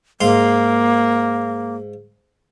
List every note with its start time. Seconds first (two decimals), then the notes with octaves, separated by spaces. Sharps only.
0.21 G#2 A#3 F5 C6